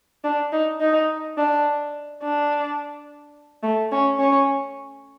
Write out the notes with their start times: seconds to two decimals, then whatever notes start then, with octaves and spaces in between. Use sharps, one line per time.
0.24 D4
0.52 D#4
0.80 D#4
1.38 D4
2.23 D4
3.63 A3
3.92 C#4
4.19 C#4